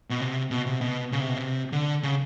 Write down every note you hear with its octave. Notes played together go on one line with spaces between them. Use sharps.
B2
C3
B2
C3
B2
C#3
C3
B2
C3
D3
C#3